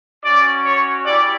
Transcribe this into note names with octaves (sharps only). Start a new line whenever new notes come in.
C#4 F#4 D5
C#5
E4 G4 D5